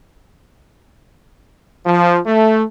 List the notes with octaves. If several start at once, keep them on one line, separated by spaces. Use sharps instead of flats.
F3
A3